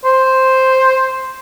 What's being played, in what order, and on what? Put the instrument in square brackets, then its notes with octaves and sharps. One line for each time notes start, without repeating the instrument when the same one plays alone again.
[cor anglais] C5